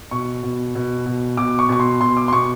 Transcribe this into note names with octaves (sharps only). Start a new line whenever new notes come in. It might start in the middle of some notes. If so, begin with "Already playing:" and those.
B2 C#6
B2
B2
B2
B2 D6
C#6
B2 C#6
C6
B2 C6
D6
C6
B2 C#6